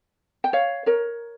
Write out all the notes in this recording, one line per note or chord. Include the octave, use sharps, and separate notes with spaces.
G5
C#5 F5
A#4 C#5